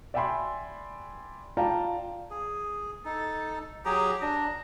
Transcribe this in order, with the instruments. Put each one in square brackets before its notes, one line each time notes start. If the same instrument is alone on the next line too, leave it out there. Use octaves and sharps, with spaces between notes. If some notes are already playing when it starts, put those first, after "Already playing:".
[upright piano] D5 E5 G5 G#5 B5 C6
F4 D5 F5 G5 A5 A#5
[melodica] G#4
[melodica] D#4 [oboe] A4
[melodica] F#3 G#4 A#5 [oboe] G4
[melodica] D4 [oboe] A#5